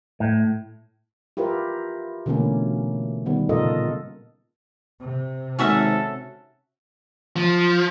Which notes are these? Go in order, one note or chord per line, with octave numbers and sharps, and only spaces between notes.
A2
E4 F4 G4 A#4 B4
B2 D3 E3 A3 A#3 C#4
D#3 G3 B3
A#2 C#3 F4 A4 A#4 D#5
C3
G#1 C#4 F#4 A4 E5
F3